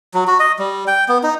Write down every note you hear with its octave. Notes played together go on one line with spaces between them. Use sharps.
F#3
F#4
D#5
G3
G5
B3
D#4